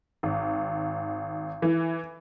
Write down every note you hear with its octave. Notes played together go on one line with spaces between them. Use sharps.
G#1
E3